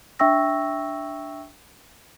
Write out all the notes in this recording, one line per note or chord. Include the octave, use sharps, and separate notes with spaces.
D4 E5 G5 C#6 E6 A#6